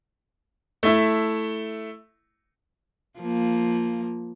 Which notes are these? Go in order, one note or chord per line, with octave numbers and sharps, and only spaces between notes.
A3 E4
F3 A#3